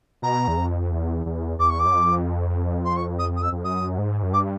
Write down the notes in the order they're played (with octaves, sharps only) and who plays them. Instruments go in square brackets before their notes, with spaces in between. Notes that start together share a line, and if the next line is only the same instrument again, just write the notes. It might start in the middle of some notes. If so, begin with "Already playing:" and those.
[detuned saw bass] B2 [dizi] A#5
[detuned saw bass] E2
F2
E2
E2
[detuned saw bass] E2 [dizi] D6
[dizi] C#6
D6
[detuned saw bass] F#2
F2
[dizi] C6
C#6
D#6
D#6
E6
[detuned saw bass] F2
[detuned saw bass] F#2 [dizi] D#6
[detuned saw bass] G#2
F#2
[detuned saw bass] G2 [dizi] D6